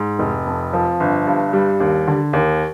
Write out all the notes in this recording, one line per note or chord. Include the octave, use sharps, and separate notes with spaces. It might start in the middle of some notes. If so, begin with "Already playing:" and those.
Already playing: G#2
F1
F2
F3
G1
G2
G3
D#2
D3
D#2